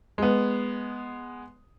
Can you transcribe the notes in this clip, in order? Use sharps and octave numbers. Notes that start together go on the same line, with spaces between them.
G#3 B3